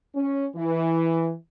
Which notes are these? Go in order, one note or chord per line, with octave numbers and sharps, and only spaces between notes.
C#4
E3